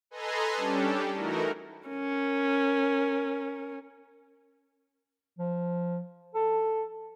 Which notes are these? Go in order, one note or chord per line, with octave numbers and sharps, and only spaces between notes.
A4 B4 D#5 G#5 A#5 C6
G3 C#4 D4 G4 A4
E3 A3 D#4 E4 F#4 A#4
C#4 A#4
F3
A4